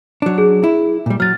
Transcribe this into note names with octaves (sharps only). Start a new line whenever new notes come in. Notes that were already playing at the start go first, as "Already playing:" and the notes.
F#3 D4
G#4
E4
A#2 G3
F#3 F6 A6